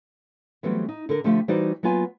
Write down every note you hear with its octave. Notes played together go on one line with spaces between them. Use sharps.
E3 F#3 G3 A3 B3 C4
D#4
D3 A4 A#4
D3 F3 A3 F4 G4 F5
E3 G3 D#4 F#4 C5 D5
F#3 A#3 B3 F4 G#5